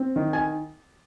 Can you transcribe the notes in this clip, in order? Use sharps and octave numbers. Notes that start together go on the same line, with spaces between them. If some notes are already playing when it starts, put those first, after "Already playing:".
Already playing: C4
D#3
G#5